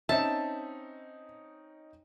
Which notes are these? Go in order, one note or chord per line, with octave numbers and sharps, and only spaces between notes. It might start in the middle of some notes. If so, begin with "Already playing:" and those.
C4 C#4 D#4 E5 A5